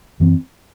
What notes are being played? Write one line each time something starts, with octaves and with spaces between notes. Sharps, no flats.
F#2 E3 C4